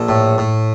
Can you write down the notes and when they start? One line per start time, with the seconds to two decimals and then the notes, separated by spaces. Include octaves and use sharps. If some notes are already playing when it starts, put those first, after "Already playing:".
Already playing: A#1 A4
0.08 A2
0.38 A2